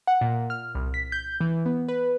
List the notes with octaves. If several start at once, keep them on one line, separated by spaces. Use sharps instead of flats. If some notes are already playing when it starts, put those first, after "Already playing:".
F#5
A#2
F6
C2
B6
G6
E3
B3
B4